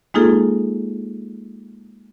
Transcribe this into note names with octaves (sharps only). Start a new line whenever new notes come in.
G#3 A#3 D#4 F4 G#4 A4